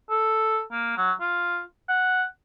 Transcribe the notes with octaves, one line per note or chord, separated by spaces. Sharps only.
A4
A#3
F#3
F4
F#5